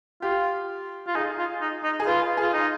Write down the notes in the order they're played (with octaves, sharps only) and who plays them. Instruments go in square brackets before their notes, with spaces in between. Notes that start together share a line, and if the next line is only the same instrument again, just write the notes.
[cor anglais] F4 [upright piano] G4
[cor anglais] F4
[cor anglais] D#4 [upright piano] G#4
[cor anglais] F4
D#4
D#4
[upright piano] G#4
[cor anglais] F4 [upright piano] B4
[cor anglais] F4 [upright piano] G#4
[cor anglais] D#4